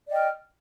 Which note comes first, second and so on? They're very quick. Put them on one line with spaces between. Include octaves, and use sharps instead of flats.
D5 D#5 G5 F6